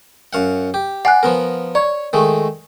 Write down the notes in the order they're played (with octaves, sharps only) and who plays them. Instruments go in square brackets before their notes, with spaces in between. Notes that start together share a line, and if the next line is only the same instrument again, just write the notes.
[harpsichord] F#2 F5 F#5
G4
[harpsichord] D5 [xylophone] F#5 G#5 F#6
[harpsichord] F3 B3 A#4
[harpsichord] C#5 [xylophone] D5
[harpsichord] D#3 G#3 A3